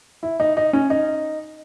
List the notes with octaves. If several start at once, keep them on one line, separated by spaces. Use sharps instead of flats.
E4
D#4
D#4
C#4
D#4